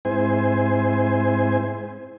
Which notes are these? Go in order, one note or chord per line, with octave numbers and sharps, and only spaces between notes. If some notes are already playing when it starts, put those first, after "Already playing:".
G#2 C4 E4 C5 G#5